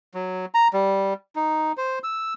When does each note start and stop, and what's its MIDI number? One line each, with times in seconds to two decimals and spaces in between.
0.14 0.46 54
0.54 0.68 82
0.73 1.14 55
1.36 1.72 63
1.77 1.99 72
2.04 2.34 88